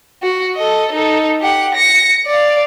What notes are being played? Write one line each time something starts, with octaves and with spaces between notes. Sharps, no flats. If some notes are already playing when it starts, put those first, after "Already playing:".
F#4
A4 D#5
D#4 A4
G4 F#5
A#6 C#7
D5 F5